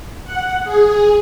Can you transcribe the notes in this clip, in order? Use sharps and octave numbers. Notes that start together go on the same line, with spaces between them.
F#5
G#4